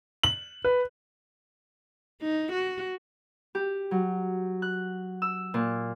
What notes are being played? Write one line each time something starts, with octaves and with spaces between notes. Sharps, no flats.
F#7
B4
D#4
F#4
G4
F#3
F#6
E6
A#2